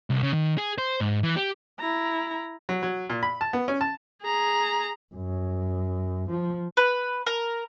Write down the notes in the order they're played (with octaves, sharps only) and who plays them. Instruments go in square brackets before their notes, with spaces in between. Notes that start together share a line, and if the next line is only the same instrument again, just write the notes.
[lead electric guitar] C2
C#3
D#3
G#4
C5
G#2
E3
G4
[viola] E4 A#5
[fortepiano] F#3
F#3
A#2
B5
A5
B3
C#4
A5
[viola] G#4 A#5
[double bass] F#2
F3
[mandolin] B4
A#4